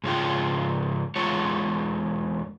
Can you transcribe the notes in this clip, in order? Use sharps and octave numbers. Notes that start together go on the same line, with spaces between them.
G#2 C#3 F4 G5
E2 G#3 F4 C#5 F#5